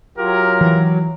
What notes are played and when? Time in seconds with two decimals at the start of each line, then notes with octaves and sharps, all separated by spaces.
0.18 F#3 F4 G4 A#4
0.61 E3